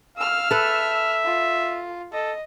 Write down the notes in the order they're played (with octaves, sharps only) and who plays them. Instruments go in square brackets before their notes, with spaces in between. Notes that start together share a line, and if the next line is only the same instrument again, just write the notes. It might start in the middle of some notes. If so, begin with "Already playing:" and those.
[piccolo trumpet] F5 [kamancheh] E6 F6
[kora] A4 B4 [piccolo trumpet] E5
[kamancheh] F4
[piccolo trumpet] A4 [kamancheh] D#5